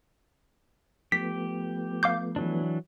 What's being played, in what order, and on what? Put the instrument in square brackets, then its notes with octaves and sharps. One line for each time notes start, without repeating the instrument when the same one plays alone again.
[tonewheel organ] F3 A3 B3 [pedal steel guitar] G4 [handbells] B6
[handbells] F5 D6 G6
[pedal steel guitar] E3 F#3 D4